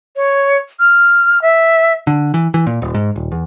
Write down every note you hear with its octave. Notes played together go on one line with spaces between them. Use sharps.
C#5
F6
E5
D3
E3
E3
A#2
D#1
G#2
D#1
E2